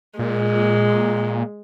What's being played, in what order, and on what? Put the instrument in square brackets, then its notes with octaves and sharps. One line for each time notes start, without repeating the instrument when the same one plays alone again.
[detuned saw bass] A#2 [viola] G#3